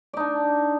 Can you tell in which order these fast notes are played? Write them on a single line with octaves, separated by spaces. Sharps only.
D5 D#4 D4